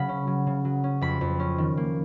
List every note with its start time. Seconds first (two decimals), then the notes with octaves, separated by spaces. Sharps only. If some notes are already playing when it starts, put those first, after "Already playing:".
Already playing: C#3 F#3 B5
0.09 C#4
0.27 F#3
0.47 C#3
0.65 F#3
0.84 C#4
1.01 F2 B5
1.21 F2
1.40 C#4
1.58 D#3
1.77 A#3